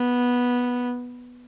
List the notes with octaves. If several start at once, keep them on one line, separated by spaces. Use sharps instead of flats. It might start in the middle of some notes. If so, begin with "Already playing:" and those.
Already playing: B3